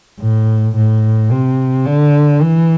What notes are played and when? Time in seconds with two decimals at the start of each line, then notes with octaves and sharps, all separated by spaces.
0.20 A2
0.76 A2
1.31 C3
1.86 D3
2.42 E3